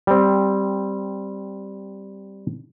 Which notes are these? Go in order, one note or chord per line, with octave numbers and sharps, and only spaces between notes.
G3 C4